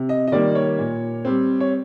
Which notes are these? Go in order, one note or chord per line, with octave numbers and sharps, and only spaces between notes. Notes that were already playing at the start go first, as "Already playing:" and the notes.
Already playing: C3
D#5
D#5
D#3 G3 A#3 D5
C#5
A#2
G3 C4
C#5